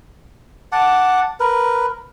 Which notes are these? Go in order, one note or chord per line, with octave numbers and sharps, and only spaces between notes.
F#5 A5 D6
A#4 B4